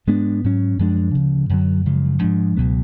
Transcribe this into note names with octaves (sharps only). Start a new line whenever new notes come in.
G#2 G#3 B3 D4
G#2 F#3 C#4
F#2 F3 G#3 D4
D2 C#3 F3
F#2 D3 F#3
F#2 C#3 F3 G#3
G#2 F3 G#3 D4
C#2 B2 F#3 B3